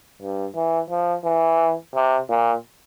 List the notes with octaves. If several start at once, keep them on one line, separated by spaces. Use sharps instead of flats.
G2
E3
F3
E3
C3
A#2